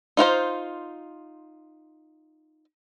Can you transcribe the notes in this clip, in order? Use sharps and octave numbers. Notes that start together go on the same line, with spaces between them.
D#4 F4 F#4 C5